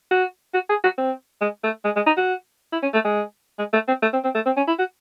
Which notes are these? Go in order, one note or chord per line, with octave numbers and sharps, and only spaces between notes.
F#4
F#4
G#4
F#4
C4
G#3
A3
G#3
G#3
D#4
F#4
E4
C#4
A3
G#3
G#3
A3
C4
A3
C4
C4
A3
C4
C#4
E4
F#4